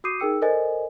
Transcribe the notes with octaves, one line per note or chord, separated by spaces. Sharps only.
F#4 D6 D#6 G6 C7 D#7
D#4 G#4 A#4 G5 E6 C#7
A4 A#4 C5 D5 D#5 G#5